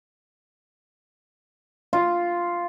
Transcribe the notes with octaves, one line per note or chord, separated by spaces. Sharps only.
F4